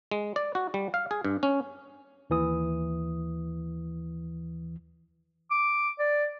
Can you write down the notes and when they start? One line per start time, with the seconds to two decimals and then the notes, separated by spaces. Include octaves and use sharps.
0.11 G#3
0.36 D5
0.55 F#4
0.74 G3
0.94 F5
1.11 G#4
1.25 G2
1.43 C#4
2.30 D#2 E3 D#6
5.51 D6
5.99 D5